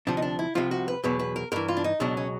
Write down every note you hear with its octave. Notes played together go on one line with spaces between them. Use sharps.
D2 C3 F3 D4
D#4
D4
E4
C2 C3 F3 F4
F#4
B4
E2 B2 F#3 B4
B4
A#4
G2 E3 A#4
F4
D4
D#4
C#2 B2 F#3 D4
C#4